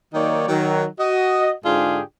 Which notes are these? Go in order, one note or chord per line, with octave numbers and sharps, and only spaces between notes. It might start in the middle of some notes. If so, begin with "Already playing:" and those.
D#3 F#3 A#3 D#4 C#5 D5
D#3 F#3
F#4 D#5
G#2 D3 D4 F4 G4 G#4